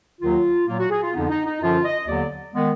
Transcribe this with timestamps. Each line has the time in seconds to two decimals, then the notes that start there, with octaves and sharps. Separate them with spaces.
0.21 D#2 D#3 F#3 F4
0.67 A#2 F#3 A#3 F4
0.79 F#4
0.90 G#4
1.03 F4
1.14 F2 D3 F3 B3 D#4
1.30 D#4
1.45 D#4
1.61 F#2 D3 F3 F4
1.84 D#5
2.07 D#2 D3 F#3 B3 D5
2.54 D#3 G#3 B3